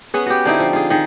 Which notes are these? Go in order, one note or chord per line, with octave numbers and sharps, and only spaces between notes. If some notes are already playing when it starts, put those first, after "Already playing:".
B3 C#4 G#4 B4
F#4 G4
D3 C4 D#4 E4
F3
F4 G#4
D#3 G#4